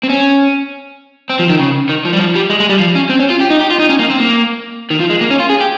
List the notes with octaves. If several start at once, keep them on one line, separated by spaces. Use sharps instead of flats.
C4
C#4
C4
F3
D#3
C#3
D#3
F3
G3
F3
G3
G#3
G#3
G3
F3
C#4
C4
C#4
F4
G4
D#4
G4
F4
D#4
C#4
A#3
C4
A#3
D#3
F3
G#3
A#3
C#4
F4
G#4
G4